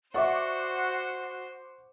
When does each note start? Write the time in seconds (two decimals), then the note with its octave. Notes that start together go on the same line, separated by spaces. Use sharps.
0.14 F#4 C5 D5 E5 F#5 C#6 D6